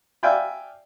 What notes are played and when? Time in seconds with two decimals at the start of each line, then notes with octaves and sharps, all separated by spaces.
0.23 D5 E5 F5 G5 G#5 B5